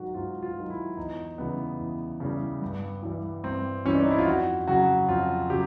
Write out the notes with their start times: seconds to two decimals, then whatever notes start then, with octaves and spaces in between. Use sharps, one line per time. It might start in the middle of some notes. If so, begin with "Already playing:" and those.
Already playing: G#2 D#3 F#3 F#4
0.15 G#2 F4
0.42 F4
0.56 D#3 F#3
0.70 E4
0.97 E2 D#4
1.38 C#3 E3 G3 B3
1.79 E2
2.20 C#3 E3 G3
2.62 G2
3.03 E3 G3
3.44 G2 C4
3.85 E3 G3 C#4
3.95 D4
4.03 D#4
4.11 E4
4.18 F4
4.26 F2 F#4
4.68 C#3 F#3 F#4
5.08 F2 F4
5.50 C#3 F#3 G4